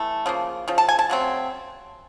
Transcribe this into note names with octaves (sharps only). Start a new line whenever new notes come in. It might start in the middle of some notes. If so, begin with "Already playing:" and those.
Already playing: E3 A3
C#3 F3 A#3
C#3 F3
A5
G#5
A5
C#3 F#3 A3 C4